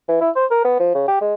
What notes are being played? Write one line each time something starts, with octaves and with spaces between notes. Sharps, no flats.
E3
E4
C5
A#4
B3
F3
C#3
G4
G#3